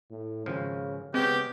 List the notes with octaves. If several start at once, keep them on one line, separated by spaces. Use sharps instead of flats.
A2
G#1 C#3 F3
C#3 G#3 B3 C4 G4